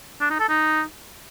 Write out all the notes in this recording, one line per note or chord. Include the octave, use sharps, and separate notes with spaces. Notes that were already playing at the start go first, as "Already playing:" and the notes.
D4
D#4
A4
D#4